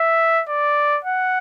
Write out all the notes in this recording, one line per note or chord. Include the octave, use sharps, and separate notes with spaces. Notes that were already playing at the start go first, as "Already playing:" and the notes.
Already playing: E5
D5
F#5